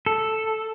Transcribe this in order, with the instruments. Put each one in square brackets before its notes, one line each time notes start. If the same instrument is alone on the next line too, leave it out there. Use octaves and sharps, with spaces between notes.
[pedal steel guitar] A4